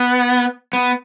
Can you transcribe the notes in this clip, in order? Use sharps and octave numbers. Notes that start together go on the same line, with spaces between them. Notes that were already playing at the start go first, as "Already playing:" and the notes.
Already playing: B3
B3